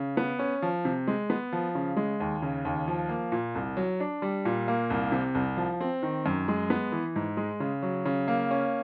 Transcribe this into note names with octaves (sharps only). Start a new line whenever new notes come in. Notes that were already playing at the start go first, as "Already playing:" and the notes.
Already playing: C#3
B3
C#4
F3
C3
G#3
B3
F3
C#3
G#3
D#2
C#3
D#2
F3
A#3
A#2
C2
F#3
D4
G3
A#2
A#3
C2
C3
C2
F3
C4
D#3
F#2
G#3
B3
E3
G#2
G#3
C#3
F#3
C#3
A#3
C#4